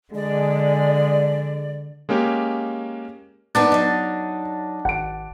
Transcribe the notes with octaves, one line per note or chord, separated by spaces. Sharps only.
D3 G#3 D5
G#3 A#3 C#4 G4
A#3 B3 D4 D#4 D5
F#3 D#4 D#5 F#5
G#1 F#5 D7